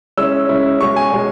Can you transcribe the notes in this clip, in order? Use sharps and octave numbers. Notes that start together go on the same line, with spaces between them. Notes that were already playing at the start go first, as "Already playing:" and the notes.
C#3 G#3 C#4 E4 E6
C#3 G#3 C#4 E4
B2 G#3 C#4 C#6
G#5
B2 G#3 C#4